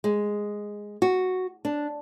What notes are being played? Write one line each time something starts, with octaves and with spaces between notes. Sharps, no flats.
G#3
F#4
D4